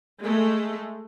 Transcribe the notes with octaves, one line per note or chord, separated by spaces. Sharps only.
G#3 A3